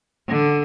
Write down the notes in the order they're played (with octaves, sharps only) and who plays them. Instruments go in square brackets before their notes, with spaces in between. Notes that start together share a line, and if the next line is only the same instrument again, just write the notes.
[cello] D3